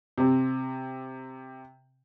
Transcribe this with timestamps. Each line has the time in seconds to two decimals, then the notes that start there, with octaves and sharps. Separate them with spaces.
0.18 C3 C4